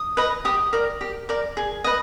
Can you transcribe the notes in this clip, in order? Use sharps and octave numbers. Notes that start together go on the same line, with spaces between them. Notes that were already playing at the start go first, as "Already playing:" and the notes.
Already playing: D#6
B4 D#5
G4 D#6
A#4 D5
G4
A#4 D5
G#4
B4 D#5